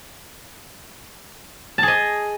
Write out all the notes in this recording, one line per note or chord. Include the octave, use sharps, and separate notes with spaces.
G#4 D#5 A5